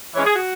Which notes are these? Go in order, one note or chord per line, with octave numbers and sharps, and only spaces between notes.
E3 G#3 C#4 C#5
G#4
F#4